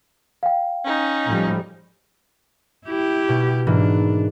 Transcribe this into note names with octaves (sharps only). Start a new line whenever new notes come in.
F5 G5
C#4 D#4
A2 F3 G3
E4 G4
B2
G#2 E3 A#3 D4